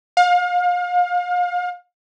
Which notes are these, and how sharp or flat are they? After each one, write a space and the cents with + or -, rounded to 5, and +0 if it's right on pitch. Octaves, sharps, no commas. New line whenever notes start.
F5 +35